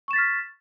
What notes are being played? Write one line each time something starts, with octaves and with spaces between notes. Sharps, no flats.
C#6 F6 A6 B6 E7